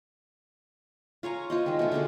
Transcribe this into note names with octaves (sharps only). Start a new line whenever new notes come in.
F4 C#5 G#5 A#5
F4 C5 D#5
D#3 G#3
B2 A3
D3 D4 G#4 A4